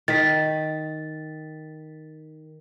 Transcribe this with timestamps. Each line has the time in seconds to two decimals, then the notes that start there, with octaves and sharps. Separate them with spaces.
0.08 D#3 A6 B6